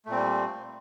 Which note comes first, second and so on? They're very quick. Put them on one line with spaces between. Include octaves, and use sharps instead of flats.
A3 A#2 C4 G3